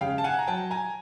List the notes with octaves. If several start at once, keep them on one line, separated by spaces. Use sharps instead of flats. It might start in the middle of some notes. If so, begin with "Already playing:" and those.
C#3 F5 G5
A5
F#5 G#5
A#5
F#3 G5 A5
G#5 A#5